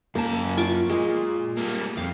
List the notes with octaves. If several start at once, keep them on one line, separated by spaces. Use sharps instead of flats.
F#2 A#3 A5
F4 C#6 D6
A#2 G#3
G3 A#3
F2 F5